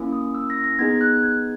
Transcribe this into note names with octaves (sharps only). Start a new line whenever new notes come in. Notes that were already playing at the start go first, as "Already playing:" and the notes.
Already playing: A#3 C#4 E4
D#6
E6
A#6
A#6
B3 D#4 G#4 G#6
F#6
G#6